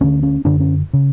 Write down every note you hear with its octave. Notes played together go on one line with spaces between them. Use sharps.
D2 D3 C#4
C#4
F#2 D3 D4
C#4
C#3